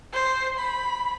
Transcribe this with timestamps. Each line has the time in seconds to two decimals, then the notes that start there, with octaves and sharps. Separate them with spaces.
0.13 C5
0.59 B5